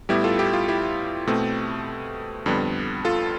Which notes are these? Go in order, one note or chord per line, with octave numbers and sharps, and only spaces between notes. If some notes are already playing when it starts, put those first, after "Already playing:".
A2 G3 B3 E4 G4
F4 A4
E4 G4
F4
E4 G4
B2 A3 C4
F2 D3 G3 B3
F4 A4